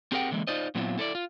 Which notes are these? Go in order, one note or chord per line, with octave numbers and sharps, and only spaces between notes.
C4 G4 G#4 A#4 F#5 G5
D3 E3 G#3 A#3
D#4 F4 C5 D5 D#5
A#2 F#3 B3 C4 E4 F4
E4 A4 C5 D5
F4